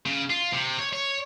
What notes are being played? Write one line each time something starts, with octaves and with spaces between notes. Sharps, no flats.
C#3
F4
C3
C#5
C#5